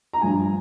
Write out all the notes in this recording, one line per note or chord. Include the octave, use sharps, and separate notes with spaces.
A#5
G2 F3 G#5